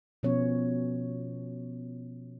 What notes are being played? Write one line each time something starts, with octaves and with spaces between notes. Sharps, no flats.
B2 F3 B3 C#4 C#5